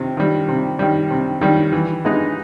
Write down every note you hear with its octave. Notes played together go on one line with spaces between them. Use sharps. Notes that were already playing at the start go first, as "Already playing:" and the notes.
Already playing: C3 D#3
D#3 G3
C3
D#3 G3
C3
D#3 G3
E3
G#3 B3 D#4